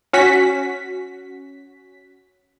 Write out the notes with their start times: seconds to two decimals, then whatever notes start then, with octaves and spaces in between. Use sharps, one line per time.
0.13 C#4 F#4 B6